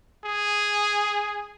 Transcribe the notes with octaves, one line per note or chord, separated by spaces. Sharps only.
G#4